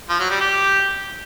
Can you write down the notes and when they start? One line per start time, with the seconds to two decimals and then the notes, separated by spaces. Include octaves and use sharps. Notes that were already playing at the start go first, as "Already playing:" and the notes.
0.09 F3
0.20 F#3
0.30 G3
0.40 G4